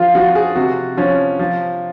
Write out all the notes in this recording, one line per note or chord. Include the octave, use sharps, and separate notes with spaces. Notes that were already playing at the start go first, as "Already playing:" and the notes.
Already playing: F3 F4
F3 F#4
G#4
C3 F#4
F3 C#4
F3